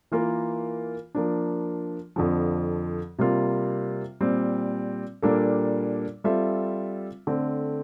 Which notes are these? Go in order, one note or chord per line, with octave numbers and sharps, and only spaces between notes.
E3 A#3 F4 A#4
F3 A#3 D4
F2 D3 F3
C3 G3 A#3 F4
A#2 G3 C4
A#2 G3 A#3 D4 A4
G3 C4 F4 A4 E5
D3 A3 C4